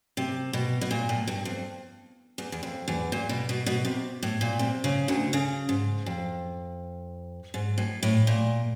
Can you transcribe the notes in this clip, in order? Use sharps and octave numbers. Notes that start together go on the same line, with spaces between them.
C3
B2
B2
A#2
A2
G2
F2
E2
E2
F2
E2
A#2
B2
B2
B2
C3
A2
A#2
C3
C#3
D2 D3
C#3
G#2
F2
G#2
A2
A2
A#2